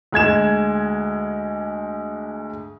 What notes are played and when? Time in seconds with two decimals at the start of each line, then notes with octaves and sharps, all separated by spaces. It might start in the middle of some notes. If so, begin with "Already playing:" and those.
0.12 D2 G#3 G#6 E7